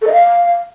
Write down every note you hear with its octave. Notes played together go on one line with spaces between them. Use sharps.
A4
D#5
F5